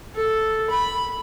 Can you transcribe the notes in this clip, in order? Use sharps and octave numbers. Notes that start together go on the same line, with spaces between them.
A4
B5